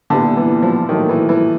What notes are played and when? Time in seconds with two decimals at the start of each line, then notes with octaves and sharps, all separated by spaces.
0.10 A#2 D3 G3 B3 E4
0.37 E3
0.63 F3
0.89 A#2 D#3 F#3 A3
1.09 E3
1.29 E3